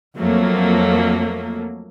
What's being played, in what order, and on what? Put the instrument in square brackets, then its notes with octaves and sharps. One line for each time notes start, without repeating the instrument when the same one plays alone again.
[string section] F2 F#3 A3 A#3